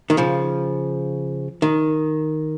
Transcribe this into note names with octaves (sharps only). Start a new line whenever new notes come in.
D#3
C#3 F3
D#3